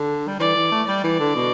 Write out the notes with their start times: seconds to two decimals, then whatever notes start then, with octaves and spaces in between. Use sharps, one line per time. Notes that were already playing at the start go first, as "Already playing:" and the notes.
Already playing: D3
0.28 G3
0.39 E3 D5
0.55 E3
0.71 A3
0.87 G3 D5
1.04 E3
1.20 D3
1.35 B2